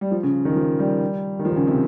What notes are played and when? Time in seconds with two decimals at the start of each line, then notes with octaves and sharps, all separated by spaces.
0.01 G3
0.11 F3
0.23 C#3
0.45 D#3
0.56 F3
0.79 G3
1.39 D#3
1.45 F3
1.52 D#3
1.56 C#3
1.67 C3